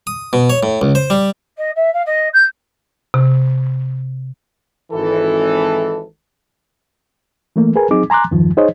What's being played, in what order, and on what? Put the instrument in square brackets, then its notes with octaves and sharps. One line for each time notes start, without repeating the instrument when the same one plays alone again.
[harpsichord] D#6
B2
C#5
A2
C#2
C5
G3
[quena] D#5
E5
F5
D#5
G6
[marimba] C3
[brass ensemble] G#1 E3 A4
[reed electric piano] E3 A3 A#3
G#4 A#4 B4 G#5
F#3 C4 D#4 G#4 D6
G#5 A#5 C6 D6 F#6
E2 G2 D#3 F3
D#4 G#4 C5 C#5 D#5